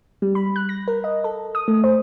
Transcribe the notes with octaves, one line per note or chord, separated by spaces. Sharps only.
G3
B5
F#6
A#6
A#4
D#5
A4
D#6
A3
C5